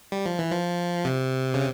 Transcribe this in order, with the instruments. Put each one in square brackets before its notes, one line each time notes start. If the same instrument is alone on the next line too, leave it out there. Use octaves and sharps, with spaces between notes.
[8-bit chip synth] G3
F3
E3
F3
C3
C#3